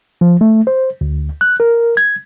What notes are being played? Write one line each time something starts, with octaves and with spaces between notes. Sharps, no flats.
F3
A3
C5
D2
F#6
A#4
G#6